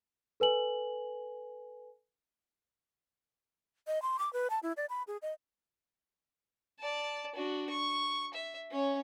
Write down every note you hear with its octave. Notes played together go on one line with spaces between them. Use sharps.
A4 B4 G#5 F#7
D#5
C6
D6
B4
A5
E4
D5
B5
G#4
D#5
D5 A5
D4 F#4
C#6
E5
C#4 C#5